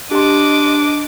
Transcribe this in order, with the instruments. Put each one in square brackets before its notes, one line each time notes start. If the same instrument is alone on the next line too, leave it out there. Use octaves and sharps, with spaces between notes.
[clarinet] D4 [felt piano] G4 C6 [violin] D#5 D6